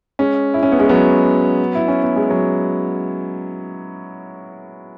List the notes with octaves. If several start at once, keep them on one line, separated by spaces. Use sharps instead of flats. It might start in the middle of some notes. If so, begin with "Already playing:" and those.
G#3 C#4
E4
C#4
B3
G#3 C#4
F#3 B3
E4
C#4
B3
G#3
F#3